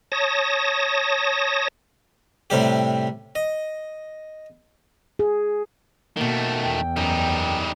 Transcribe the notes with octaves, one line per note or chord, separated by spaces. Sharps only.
C#5 A5 D#6 A#6
A2 C3 G3 G4
D#5
G#4
B2 D#3 A3 A#3
E2 G5
F#2 G3 D#4